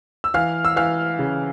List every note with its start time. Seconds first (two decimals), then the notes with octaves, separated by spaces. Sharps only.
0.24 E6
0.34 E3 F5 F6
0.65 E6
0.76 E3 F5 F6
1.19 C#3